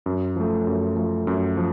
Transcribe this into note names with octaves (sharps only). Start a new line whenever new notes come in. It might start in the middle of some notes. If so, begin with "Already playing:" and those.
F#2
F3 A3
F#2
F3 A3
F#2
F3